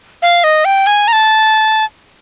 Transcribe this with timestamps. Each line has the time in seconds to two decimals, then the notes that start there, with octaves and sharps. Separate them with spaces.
0.22 F5
0.44 D#5
0.65 G5
0.87 G#5
1.08 A#5
1.13 A5